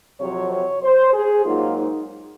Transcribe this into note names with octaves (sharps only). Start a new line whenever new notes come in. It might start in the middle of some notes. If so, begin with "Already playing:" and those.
F2 C3 F#3 C#5
C#5
C5
G#4
G#2 F#3 A#3 D#4 F4
D#4